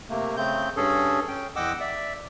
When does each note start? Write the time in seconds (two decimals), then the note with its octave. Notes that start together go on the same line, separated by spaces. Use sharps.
0.10 C3 A3 A#3
0.37 C#3 A3 C4 G6
0.77 G2 C#4 G#4 A4
1.28 C#4 G5
1.56 E2 D#5 F#5 G5 D6 E6
1.80 D5 E5